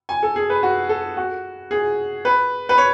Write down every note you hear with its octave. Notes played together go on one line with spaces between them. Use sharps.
G#5
A4
G#4
B4
F#4
A4
F#4
G#4
B4
B4
C#5